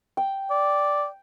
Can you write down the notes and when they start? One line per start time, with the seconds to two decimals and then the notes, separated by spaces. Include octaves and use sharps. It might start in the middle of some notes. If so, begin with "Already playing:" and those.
0.17 G5
0.50 D5